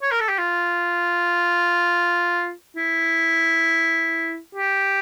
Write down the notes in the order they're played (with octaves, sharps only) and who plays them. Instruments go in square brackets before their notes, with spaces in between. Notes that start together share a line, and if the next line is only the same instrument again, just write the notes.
[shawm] C#5
A#4
A4
G4
F4
E4
G4